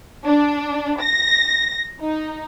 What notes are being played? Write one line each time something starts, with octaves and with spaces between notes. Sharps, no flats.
D4
A#6
D#4